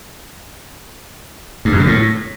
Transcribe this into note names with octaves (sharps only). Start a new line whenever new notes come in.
G2
F#2
C#3
A2